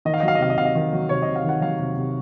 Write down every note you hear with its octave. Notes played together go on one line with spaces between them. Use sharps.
D#3 D#5
F5
D#5
F#3
F5
D#5
C3 F5
D#5
C3 F5
D#5
D#3
F#3
C3 C#5
D#5
C3
F5
D#3 F#5
F#3 F5
C3
C3